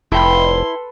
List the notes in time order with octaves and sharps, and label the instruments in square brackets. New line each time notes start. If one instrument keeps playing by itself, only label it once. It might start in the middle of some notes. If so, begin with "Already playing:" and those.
[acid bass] F1 [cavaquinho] E4 G5 B5 [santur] A4 B4 [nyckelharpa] C6